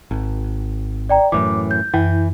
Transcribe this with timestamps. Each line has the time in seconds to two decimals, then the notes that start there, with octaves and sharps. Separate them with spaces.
0.11 G#1
1.09 D5 G5 A#5
1.32 F#2 A2 E3 D6
1.71 G6
1.94 F#2 E3